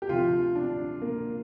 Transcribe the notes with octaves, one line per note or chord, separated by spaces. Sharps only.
G4
D2 C3 F3 F4
D4
A#3